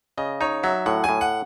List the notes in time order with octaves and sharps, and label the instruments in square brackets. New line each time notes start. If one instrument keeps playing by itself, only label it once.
[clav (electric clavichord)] C#3 [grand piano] D#5
[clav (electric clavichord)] D#4 [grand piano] C#5
[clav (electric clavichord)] F#3 [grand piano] E5
[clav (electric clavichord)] A2 [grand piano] F#5
[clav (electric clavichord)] A2 [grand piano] G#5
[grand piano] F#5